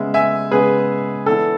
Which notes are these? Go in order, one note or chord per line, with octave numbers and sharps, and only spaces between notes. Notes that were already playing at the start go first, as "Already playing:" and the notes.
Already playing: C#3 G#3 B3 E5
E5 G#5
C#3 G#3 B3 G#4 B4
E3 B3 D4 A4